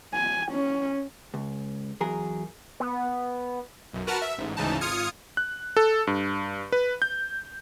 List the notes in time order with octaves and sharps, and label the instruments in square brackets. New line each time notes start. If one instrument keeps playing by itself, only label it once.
[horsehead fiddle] G#5
C#4
[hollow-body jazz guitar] C#2
E2 F#3 G#4 A#4
[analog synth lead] B3
[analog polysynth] B1 F#2
F#4 A#4 B4 F#5 A5 F6
E5
A1 G#2
D2 G#2 C#3 E3 D#4 A5
G#1 F4 D#6 F6 G#6 C#7
[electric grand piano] F#6
A4
G2
B4
G6